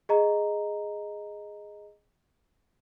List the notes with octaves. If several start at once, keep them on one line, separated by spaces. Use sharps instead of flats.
G#4 D#5 A#5